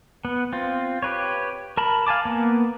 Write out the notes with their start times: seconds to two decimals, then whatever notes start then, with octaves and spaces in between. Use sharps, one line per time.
0.25 B3
0.53 C4 F4
1.02 G4 B4 C#5
1.77 A#4 A5 B5
2.07 F5 G#5 A5 D6
2.25 A#3 B3